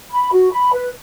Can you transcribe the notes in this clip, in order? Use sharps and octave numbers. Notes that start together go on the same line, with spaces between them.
B5
F#4
B5
B4